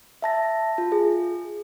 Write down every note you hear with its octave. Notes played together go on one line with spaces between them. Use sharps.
E5 A5 A#6
F4
G#4